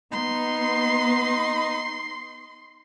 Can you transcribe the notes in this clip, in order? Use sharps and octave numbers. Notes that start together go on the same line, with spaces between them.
B3 D#4 C6